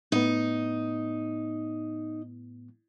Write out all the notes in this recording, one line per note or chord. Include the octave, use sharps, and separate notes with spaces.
A2 B3 D#4